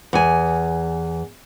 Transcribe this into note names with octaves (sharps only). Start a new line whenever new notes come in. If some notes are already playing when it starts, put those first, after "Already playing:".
E2 G#5